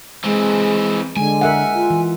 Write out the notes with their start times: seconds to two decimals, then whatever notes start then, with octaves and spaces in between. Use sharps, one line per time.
0.24 E3 G#3 C4
1.16 D3 G#3 G#5
1.41 A#4 E5 F#5
1.75 F4
1.90 E3